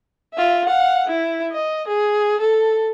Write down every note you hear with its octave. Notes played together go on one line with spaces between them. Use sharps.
F4 E5
F5 F#5
E4
D#5
G#4
A4